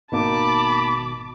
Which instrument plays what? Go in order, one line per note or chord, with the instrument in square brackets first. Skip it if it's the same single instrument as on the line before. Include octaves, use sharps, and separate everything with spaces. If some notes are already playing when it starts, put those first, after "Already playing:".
[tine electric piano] G#1 B2 [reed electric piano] D#3 A#3 D#4 [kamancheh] A5 D6 [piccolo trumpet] B5